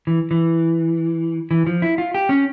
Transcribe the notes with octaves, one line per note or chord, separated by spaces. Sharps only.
E3
E3
E3
F3
E4
F4
G4
C#4